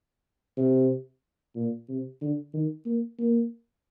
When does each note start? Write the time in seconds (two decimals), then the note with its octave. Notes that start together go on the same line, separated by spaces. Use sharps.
0.57 C3
1.55 A#2
1.89 C3
2.21 D3
2.54 D#3
2.86 A#3
3.19 A#3